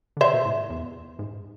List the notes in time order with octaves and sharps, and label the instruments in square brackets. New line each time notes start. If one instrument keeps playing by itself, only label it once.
[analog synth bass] D3
[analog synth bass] C3 [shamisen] C5 E5
[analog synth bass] B2
A2
E2
G#2